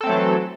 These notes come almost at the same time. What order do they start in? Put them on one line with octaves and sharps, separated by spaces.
A4 C4 A3 F#3 E3